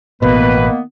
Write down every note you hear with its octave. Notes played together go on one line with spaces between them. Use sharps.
A1 B2 D#3 A#3 B3 B4